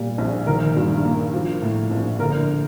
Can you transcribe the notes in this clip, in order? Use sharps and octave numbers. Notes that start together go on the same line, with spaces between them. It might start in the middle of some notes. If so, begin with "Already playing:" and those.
Already playing: A#2 G3
A#1
D#3 A#4
G2
A#3
F3
A2
A#1
D3 A#4